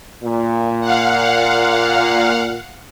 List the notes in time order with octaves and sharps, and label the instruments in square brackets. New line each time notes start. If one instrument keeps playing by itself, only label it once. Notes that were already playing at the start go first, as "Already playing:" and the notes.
[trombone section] A#2
[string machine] F5 F#5